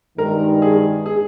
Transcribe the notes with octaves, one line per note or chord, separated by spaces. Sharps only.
G2 D#3 G#3 A#4
G#4
G#4